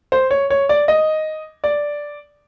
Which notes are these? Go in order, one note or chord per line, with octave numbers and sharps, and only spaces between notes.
C5
C#5
C#5
D5
D#5
D5